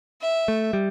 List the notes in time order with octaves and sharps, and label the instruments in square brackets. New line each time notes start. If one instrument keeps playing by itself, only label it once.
[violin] E5
[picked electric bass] A3
G3